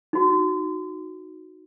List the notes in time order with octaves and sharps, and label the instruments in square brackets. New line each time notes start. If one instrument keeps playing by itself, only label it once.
[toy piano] D#4 F#4